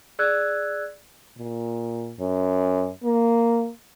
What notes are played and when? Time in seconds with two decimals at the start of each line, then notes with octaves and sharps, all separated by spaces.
0.19 G#4 D5 E6 F#6 G#6
1.38 A#2
2.20 F#2
3.03 A#3